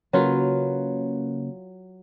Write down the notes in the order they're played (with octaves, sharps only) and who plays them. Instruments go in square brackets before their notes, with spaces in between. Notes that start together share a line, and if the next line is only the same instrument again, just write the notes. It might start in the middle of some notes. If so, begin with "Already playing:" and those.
[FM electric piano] C#3 A#3 C#4 [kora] F#3 F4 B4